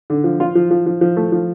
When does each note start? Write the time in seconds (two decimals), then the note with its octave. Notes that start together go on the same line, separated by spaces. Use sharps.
0.10 D3
0.24 F3
0.40 F4
0.55 F3
0.71 F3
0.86 F3
1.01 F3
1.17 A3
1.32 F3